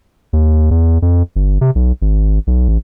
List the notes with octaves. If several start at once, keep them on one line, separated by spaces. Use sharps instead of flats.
D#2
E2
F2
G1
C3
B1
G#1
B1
A1